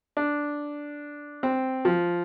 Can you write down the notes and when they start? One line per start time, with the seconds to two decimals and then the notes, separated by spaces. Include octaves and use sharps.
0.17 D4
1.43 C4
1.85 F3